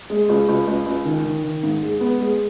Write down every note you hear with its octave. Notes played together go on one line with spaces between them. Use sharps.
G#3
C#2
C#2
C#2
C#2
D#3
D#3
D#3
G#2
G#3
B3
G#3